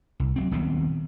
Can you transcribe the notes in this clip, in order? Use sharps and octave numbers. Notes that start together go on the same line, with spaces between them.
C2
F#3 G#3 C4
D#1 D#2 B3 C4